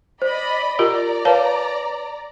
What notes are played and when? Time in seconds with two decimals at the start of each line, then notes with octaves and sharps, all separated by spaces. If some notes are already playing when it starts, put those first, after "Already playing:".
0.22 C5 D5 D#5 B5
0.79 F4 G4 A#4 D5 D#5 A#5
1.25 B4 C#5 F5 A5